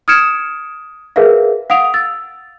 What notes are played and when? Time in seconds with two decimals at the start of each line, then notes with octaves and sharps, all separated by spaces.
0.08 D#6 F6 G#6 C#7 D7 E7
1.16 G#4 A#4 B4 E5 F5
1.70 F5 F#5 D#6 D7 F7
1.94 E6 A6